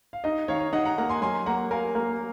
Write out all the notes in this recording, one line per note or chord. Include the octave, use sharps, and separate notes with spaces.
F5
D#4 D#5
D#3 C#5 F5
D#4 D#5 F#5
F#5 A#5
A#3 F#5 A#5
G#5 C6
F#3 G#5 C6
A#3 F#5 A#5
A#4 F5 G#5
A#3